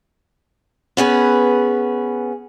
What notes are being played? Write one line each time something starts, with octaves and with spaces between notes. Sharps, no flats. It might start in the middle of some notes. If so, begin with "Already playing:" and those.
B3 C#4 G#4 B4